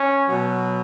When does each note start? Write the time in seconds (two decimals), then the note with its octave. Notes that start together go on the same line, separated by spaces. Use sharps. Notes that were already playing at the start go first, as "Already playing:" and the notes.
Already playing: C#4
0.29 B2 F#3